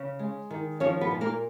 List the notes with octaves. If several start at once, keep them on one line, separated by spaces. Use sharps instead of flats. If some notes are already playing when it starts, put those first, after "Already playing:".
Already playing: C#3
G#3
D#3
F3 C#4 C#5
B3 B4
A#2
A#3 A#4